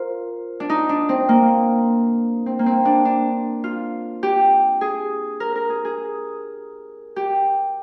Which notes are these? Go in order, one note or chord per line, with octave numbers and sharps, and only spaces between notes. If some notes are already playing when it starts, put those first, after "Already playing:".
Already playing: F4 A#4 C5
D4
D#4
D4
C4
A#3
C4
A#3
C4
D4
D4
F4
G4
G#4
A#4
A#4
G#4
G#4
G4